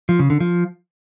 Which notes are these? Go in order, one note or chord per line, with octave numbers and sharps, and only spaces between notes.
F3
C#3
D3
F3